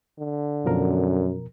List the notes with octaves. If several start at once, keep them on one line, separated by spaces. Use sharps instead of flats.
D3
F#2 B2 F3 A#4